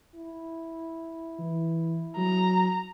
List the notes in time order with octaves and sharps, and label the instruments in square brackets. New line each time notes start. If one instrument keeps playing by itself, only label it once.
[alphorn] E4
[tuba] E3
[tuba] F#3 [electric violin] A#5